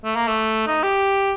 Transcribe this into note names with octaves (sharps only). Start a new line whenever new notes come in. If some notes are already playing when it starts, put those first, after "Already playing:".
A3
A#3
A3
D#4
G4